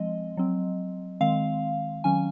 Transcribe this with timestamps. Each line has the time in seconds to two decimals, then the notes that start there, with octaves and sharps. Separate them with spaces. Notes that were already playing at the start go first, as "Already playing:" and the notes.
Already playing: F3 G#3 C4 D#5
0.37 F#3 C4
1.21 D#3 G#3 C4 F5
2.04 D#3 F#3 C#4 G#5